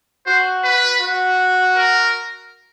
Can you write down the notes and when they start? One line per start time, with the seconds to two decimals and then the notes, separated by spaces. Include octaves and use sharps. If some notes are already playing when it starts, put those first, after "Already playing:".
0.26 F#4 C5
0.64 B4
1.01 F#4
1.76 A#4